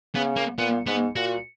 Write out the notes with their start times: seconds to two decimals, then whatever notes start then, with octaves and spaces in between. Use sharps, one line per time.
0.14 C#3 B3
0.36 A#3
0.58 A#2 B3
0.87 G#2 B3
1.16 A#2 F#4